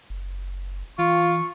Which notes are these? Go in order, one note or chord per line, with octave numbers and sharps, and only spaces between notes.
F#1
E3 F4 C#6